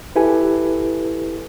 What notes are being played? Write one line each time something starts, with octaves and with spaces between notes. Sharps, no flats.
E4 G4 A4 B4 G#5